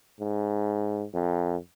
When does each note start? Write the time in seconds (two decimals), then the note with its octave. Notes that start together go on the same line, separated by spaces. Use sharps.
0.21 G#2
1.14 F2